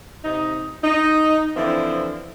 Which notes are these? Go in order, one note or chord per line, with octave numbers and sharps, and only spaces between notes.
C3 D#4
D#4
D3 E3 F3 C4 E4